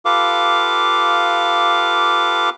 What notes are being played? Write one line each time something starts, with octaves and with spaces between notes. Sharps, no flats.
F4 G4 A4 B4 F5 D6